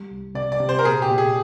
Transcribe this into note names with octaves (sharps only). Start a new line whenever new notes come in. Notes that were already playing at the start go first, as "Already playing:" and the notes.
Already playing: G3
C2
C3 D5
D5
C3
C5
A#4
A#2 G#4
G4
A#2
G#4